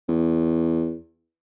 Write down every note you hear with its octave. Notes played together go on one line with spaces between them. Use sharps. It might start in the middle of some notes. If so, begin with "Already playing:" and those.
E2